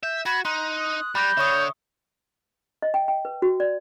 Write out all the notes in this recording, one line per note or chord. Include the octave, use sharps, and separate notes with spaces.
E5 G6
F#4 B5 G#6
D#4 A#5 C6 F#6
D#6
G3 B5 D6 G6 A#6
D3 C#5 E5 C#6 D#6
D#5
G5
G5
B4
F#4
D5